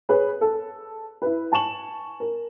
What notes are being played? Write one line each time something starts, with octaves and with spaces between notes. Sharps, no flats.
G#4 B4 C#5
A4
E4 B4
G#5 A5 C#6 E7 F#7
A#4